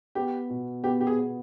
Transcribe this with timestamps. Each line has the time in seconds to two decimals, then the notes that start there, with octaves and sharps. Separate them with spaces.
0.15 B3 G4
0.50 B2
0.84 B3 G4
1.01 G4
1.07 G#4
1.19 B3